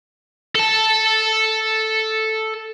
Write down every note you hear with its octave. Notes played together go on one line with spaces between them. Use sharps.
A4 A5